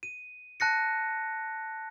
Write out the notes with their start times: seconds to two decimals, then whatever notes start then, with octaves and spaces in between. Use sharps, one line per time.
0.03 D#7
0.60 A5 F#6 A#6 C#7